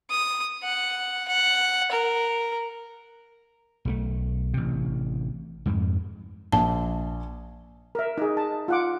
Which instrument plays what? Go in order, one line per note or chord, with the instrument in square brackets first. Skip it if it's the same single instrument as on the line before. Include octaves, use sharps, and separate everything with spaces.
[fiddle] D#6
F#5
F#5
A#4
[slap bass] B1 F#3 A3
A1 C3
F2 G#2
[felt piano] A#1 [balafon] A5
[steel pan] A#4 E5
D#4 G#4
A5
F4 F#5 D6